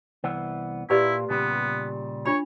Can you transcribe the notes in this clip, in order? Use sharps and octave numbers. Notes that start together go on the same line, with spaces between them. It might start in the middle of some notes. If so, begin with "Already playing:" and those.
C2 E3 B3
A#2 A#3 E4 G4 B4 D5
A#2 C#3 G3 B3
D4 F4 C#5 B5